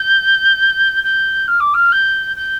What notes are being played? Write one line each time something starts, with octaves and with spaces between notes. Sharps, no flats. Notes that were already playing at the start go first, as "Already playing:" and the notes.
Already playing: G6
G6
F6
D6
F6
G6
G6